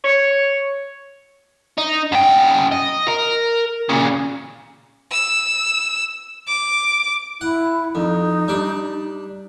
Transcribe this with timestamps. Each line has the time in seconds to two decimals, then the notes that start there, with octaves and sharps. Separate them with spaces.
0.05 C#5
1.78 D#4
2.12 F#2 G5
2.72 D#5
3.08 A#4
3.89 A#2 C#3
5.12 E6
6.48 D6
7.41 E4 F#5
7.95 F2 D#4
8.48 G3 D4